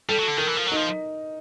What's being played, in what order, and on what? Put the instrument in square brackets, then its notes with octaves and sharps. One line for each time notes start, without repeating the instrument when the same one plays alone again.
[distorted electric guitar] G3 [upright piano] A4
[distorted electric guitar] F#3
D3
[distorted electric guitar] D#3 [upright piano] A#4
[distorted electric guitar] E3
F3
[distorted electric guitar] F#3 [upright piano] D#4
[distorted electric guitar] F3